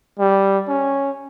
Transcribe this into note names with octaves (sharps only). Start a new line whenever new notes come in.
G3
C#4